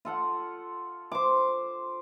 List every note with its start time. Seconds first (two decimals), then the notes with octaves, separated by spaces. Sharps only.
0.05 F4 A4 F#5
1.12 C5 D6